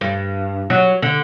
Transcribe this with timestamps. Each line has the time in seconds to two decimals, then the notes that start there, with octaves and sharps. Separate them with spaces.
0.01 G2
0.70 F#3
1.02 D3